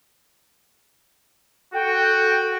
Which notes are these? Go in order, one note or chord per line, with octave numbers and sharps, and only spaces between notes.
F#4 A4 G5